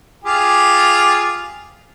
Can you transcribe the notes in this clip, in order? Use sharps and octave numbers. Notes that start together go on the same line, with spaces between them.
F4 G4 G#4